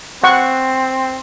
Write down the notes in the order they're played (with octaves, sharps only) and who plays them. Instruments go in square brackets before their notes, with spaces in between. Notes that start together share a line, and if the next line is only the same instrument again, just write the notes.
[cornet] C4 [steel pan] F#5 C#6